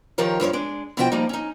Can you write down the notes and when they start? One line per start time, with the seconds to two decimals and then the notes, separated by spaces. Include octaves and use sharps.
0.18 D#3 F3 G4 A#4 C#5
0.40 G2 F3 A#4 C#5
0.53 G#3 D4
0.97 B2 E3 F3 F#4 B4 G5
1.12 F3 G3 A#3 D#4
1.29 C#4 D#4